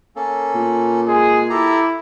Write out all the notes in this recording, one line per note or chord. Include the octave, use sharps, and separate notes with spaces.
A#3 C#4 A4
A#2
G#3 G#4
E4 G4 A4 A#5